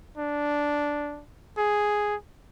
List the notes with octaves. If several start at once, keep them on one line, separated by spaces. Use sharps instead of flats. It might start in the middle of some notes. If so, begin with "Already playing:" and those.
D4
G#4